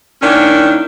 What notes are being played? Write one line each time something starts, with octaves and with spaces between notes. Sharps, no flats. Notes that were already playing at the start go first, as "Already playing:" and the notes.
D#3 A#3 C#4 D4 E4